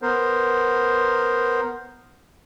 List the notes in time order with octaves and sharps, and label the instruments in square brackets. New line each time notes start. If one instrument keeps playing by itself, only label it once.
[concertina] B3 A#4 C5